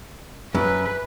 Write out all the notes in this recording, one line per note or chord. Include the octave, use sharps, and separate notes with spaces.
F#2 B4